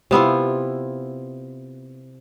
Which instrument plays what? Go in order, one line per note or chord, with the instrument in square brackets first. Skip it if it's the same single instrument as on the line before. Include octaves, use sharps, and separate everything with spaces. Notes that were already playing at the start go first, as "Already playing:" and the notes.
[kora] C3 B3 E4 F4